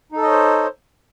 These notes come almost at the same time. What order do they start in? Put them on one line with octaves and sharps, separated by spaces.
D#4 A4 D#5 C#5 C5